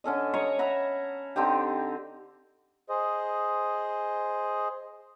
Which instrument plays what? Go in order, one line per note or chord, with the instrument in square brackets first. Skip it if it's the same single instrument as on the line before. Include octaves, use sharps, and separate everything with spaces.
[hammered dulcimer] D3 C#4 A4 D#5
C#5 D#5 A#5 C#6
E5 F#5 A#5 B5
D3 C4 D#4 G4
[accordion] G#4 C5 D#5